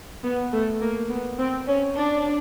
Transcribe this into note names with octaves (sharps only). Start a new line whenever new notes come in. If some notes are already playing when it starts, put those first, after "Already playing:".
B3
A3
A#3
B3
C4
C#4
D4